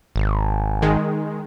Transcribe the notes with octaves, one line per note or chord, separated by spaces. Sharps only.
G#1
D#3 G#3